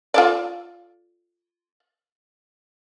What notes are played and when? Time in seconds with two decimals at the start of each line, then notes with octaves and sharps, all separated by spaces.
0.14 F4 A4 D5